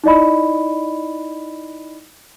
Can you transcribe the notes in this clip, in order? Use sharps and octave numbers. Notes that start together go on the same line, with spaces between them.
D#4 E4 D5 D#5 B5